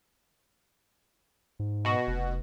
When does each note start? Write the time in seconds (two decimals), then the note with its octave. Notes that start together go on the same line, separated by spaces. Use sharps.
1.59 G#2
1.85 B2 F#4
2.07 F1